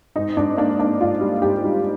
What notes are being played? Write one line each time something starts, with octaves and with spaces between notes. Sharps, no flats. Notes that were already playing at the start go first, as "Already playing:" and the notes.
G#2 D#4
G#2 D4
A#3 D4
A#3 D4
G#2 F4
G3
G#2 G4
G3